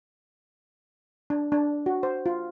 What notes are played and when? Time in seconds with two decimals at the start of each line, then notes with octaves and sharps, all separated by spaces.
1.30 D4
1.52 D4
1.86 F#4
2.03 C5
2.26 F4